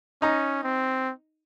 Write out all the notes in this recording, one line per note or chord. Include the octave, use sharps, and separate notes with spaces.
C#4 D#4 A#5
C4